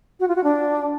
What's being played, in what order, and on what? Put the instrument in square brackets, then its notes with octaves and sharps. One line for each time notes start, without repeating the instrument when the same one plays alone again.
[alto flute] F#4
F4
F#4
D4